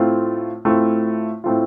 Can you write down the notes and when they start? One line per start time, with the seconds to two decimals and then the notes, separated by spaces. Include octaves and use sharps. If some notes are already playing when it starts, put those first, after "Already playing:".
Already playing: A2 A3 C4 F4
0.65 A2 A3 C4 F4
1.44 A2 A3 C4 F4